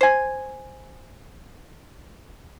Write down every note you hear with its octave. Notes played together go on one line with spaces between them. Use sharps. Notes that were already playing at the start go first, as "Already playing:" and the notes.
C5 G#5